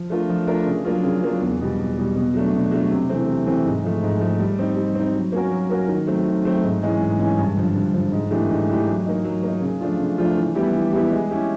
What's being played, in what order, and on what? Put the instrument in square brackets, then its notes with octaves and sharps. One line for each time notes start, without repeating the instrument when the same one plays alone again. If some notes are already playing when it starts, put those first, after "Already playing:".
Already playing: [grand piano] F3
A3 D4 F4 A#4
F3
A3 D4 F4 A#4
C#3
F#3 A#3 D4 F4
C#3
F#3 A#3 D4 F4
E2
B2 G3
E2
B2 G3
B2
F#3 A3 D4
B2
F#3 A3 D4
C3
E3 A3 C4
C3
E3 A3 C4
G#2
F3 A3
G#2
F3 A3
G3
C4 D#4
G3
C4 D#4
F#3
A#3 C#4 F#4 A#4
F#3
A#3 C#4 F#4 A#4
D#3
F#3 A3 C4
D#3
F#3 A3 C4
G#2
E3 G#3 C#4
G#2
E3 G#3 C#4
G2
D3 F3
G2
D3 F3
G#2
E3 A3 D4 G4
G#2
E3 A3 D4 G4
F#3
A#3 D#4
F#3
A#3 D#4
C#3
F3 A3 D4 F4
C#3
F3 A3 D4 F4
E3
G3 B3 E4 G4
E3
G3 B3 E4 G4
G#3
C#4 E4 G4